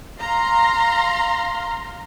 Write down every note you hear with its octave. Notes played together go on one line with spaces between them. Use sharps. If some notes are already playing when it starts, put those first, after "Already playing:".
F5 A#5 C6